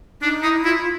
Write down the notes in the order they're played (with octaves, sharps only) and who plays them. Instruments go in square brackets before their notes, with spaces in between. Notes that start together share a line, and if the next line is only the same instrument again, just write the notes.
[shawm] D4 [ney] D#4
[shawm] D#4 [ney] E4
[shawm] E4 [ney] F4